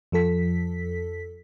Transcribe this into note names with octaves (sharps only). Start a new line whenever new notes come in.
F2 F3 A4 B6